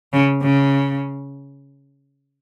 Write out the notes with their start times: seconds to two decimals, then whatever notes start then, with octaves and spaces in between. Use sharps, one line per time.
0.13 C#3
0.42 C#3